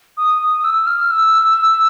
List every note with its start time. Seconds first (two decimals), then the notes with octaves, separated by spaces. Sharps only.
0.17 D#6
0.41 D#6
0.59 D#6
0.64 E6
0.87 F6
1.11 E6